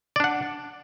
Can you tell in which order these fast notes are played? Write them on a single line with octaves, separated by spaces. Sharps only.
D5 D4 F#5